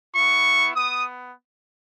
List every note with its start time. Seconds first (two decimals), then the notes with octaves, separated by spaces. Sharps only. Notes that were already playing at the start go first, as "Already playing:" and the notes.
0.14 B3 E4 C#6
0.75 B3 D#6